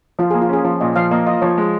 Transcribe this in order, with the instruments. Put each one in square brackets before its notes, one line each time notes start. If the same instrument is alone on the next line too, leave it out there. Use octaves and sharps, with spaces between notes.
[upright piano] F3 [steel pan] F4
[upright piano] A#3 [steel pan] G#4
[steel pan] F4
[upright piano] C#4 [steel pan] G#4
[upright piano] F3 [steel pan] F4
[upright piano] A#2 [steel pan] D#5
[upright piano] F3 [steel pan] F5
[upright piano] A#3 [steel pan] D#5
[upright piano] F4 [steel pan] D#5
[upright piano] F3 [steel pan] C#5
[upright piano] G#3